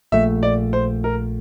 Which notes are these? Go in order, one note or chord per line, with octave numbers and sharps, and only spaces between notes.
A#1 A#2 A3 E5
D5
C5
A#4